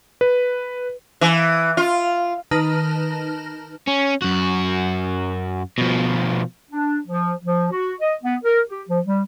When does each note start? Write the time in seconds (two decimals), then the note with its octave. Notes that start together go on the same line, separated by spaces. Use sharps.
0.21 B4
1.21 E3
1.77 F4
2.51 D#3 D#4 B4 A5 F6 A#6
3.88 C#4
4.22 F#2 F#4
5.78 B2 F3
6.71 D4
7.07 F3
7.44 F3
7.72 F#4
8.00 D#5
8.24 B3
8.44 A#4
8.69 G4
8.89 F3
9.06 G3